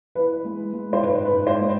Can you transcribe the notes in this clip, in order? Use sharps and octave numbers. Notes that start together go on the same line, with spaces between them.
E3 B4
G#3
G#3
C5
G#2 B4
B4
G#2
C5
G#3